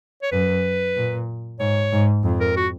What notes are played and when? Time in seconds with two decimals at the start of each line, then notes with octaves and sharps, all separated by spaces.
0.22 C#5
0.32 F#2 B4
0.96 A#2
1.60 G#2 C#5
1.92 G#2
2.24 F2
2.40 A#4
2.56 F#4